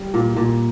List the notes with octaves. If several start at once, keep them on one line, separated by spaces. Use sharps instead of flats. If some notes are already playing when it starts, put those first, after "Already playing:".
Already playing: G3
A#2
A#2